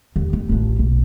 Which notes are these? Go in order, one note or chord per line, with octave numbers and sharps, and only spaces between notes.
D#2
D#3
A1 F3
B1